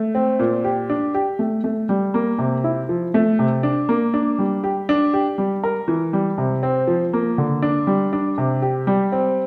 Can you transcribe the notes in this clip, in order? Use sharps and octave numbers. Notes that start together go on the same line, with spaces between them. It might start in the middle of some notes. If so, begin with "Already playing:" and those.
Already playing: A3
C4
A#2
G4
D4
G4
A3
A3
G3
A#3
C3
E4
F3
A3
C3
D4
A#3
D4
G3
G4
D4
G4
G3
A#4
E3
G3
C3
C4
F3
A#3
D3
D4
G3
D4
C3
G4
G3
C4